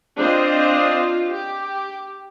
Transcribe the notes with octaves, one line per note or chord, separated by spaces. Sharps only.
C4 D4 F4 C5 D#5
G4